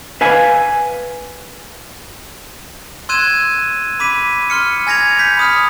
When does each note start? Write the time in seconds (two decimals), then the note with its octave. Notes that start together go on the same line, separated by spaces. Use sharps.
0.21 B4 F5 G#5
3.09 C6 E6 F#6 G#6 D#7 E7
4.00 B5 D6 B6 D#7
4.50 C6 F6 C#7
4.87 G#5 G#6 A#6 C#7 F7
5.19 G6 B6 C#7
5.37 B5 D#6 F6